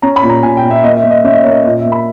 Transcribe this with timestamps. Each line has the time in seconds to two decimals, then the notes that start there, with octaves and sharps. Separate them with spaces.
0.02 C#4 A#5
0.16 B5
0.23 A#2
0.29 A#5
0.43 A#2 G#5
0.57 G5
0.63 A#2
0.70 E5
0.84 A#3 D#5
0.97 E5
1.04 A#3
1.10 D#5
1.24 C#4 E5
1.33 D#5
1.43 A#3 C#5
1.52 D#5
1.65 A#2 D#5
1.79 E5
1.85 A#3
1.92 B5